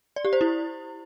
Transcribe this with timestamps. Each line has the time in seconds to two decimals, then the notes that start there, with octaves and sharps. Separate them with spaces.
0.16 D5
0.25 G4
0.33 C5
0.41 E4